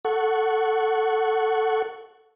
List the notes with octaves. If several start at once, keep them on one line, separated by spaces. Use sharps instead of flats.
A4 F#5 C#6